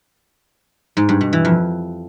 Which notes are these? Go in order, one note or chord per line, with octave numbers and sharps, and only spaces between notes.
G#2
G2
B2
E3
F2